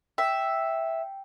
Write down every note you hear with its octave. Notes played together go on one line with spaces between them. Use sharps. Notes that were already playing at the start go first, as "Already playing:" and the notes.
E5 G5